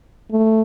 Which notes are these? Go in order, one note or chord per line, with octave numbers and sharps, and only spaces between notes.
A3